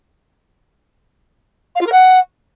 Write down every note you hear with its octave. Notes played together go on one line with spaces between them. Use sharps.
F5
F4
A#4
F#5